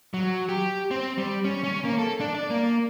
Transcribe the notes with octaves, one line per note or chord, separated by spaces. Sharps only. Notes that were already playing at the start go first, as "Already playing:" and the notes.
F#3
G4
C4
G3
C#4
C#4
A#3
A4
D4
D5
A#3